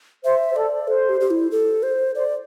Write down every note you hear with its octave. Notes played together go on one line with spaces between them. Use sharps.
C5 E5
C5
A4 D5
A4 C5
G4
G4
E4
A4
C5
C5 D5